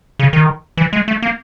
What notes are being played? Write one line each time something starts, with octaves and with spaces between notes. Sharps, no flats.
C#3
D#3
E3
G#3
A3
A#3